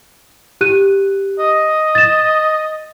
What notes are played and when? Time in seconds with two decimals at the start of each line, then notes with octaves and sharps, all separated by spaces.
0.61 G4 F#6 D#7
1.39 D#5
1.95 A6 E7